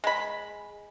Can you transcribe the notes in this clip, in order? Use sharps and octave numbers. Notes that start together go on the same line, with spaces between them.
G#3 B5